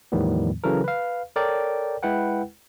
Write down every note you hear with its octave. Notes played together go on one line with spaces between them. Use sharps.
E2 A2 D#3 F3 G3 B3
C#3 E3 F#3 A4 A#4
B4 F5
A4 A#4 C#5 D5 G5
G#3 E4 B4 F#5 G5